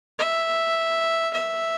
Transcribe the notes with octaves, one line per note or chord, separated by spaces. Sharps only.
E5
E5